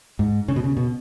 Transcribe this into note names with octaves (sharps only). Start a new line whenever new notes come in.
G#2
C#3
B2
C#3
B2